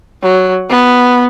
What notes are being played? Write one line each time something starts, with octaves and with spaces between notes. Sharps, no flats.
F#3
B3